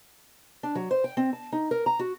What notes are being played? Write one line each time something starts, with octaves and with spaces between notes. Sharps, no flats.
D4
F#3
C5
G5
C4
A5
D#4
A#4
A#5
F#4